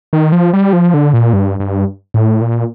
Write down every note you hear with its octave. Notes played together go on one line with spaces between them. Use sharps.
D#3
F3
G3
F3
D3
A#2
G2
G2
A2
A#2